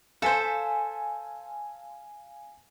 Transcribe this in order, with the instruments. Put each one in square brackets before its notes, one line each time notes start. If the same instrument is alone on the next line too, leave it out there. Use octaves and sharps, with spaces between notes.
[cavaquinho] A4 C5 [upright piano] F5 G#5 B6